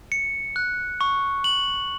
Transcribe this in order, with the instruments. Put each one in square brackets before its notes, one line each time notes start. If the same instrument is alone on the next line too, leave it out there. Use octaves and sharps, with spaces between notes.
[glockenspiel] C#7
F#6
C#6
F#7